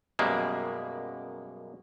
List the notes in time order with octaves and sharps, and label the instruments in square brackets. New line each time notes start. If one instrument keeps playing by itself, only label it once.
[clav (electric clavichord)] F#2 B2 G3 G#3 A#3